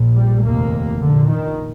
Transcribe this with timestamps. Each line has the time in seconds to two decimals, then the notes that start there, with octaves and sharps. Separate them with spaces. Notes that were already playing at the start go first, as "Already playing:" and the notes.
Already playing: A#1 A#2
0.15 G3
0.44 F1 D#2 A#3
1.00 A#1 A#2 D3
1.29 D#3